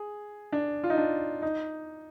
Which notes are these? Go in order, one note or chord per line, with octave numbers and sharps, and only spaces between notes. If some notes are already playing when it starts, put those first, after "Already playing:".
Already playing: G#4
D4
F4
D#4
D4
D#4